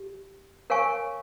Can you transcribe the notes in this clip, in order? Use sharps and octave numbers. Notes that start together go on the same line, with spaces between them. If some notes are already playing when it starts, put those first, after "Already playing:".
Already playing: G4
A#4 C#5 F5 G#5 C#6